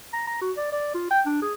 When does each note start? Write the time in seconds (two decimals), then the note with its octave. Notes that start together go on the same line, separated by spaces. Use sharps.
0.14 A#5
0.27 A#5
0.42 F#4
0.57 D5
0.72 D5
0.95 F4
1.11 G5
1.26 D4
1.42 G#4